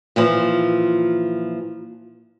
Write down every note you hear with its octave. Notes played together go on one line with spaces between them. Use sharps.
A#2 E3 F3